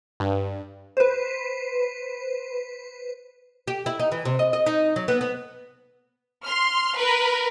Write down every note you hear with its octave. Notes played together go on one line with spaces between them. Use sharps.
G2
B4 C5
G4
E4
D#4
E3
C3
D#5
D#5
D#4
F#3
B3
B3
C6 F6
A#4 B4